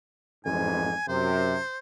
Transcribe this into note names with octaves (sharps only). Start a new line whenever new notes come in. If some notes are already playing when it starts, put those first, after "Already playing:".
A1 F2 G#2 G#5
F#2 C3 C5